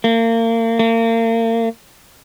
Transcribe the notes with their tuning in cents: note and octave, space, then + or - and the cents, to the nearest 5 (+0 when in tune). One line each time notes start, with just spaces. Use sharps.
A#3 -35
A#3 -35